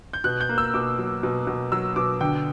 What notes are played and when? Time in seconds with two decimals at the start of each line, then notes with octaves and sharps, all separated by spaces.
0.13 G6
0.24 B2 F#6
0.41 G6
0.49 A#3
0.58 E6
0.74 B2 D6
0.99 F#3
1.23 B2
1.47 B2
1.72 F#3 E6
1.96 B2 D6
2.21 D3 G5